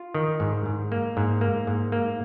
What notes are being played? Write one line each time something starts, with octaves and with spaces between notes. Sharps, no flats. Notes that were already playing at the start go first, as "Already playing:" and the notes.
Already playing: F4
D#3
G#2
G#2
A#3
G#2
A#3
G#2
A#3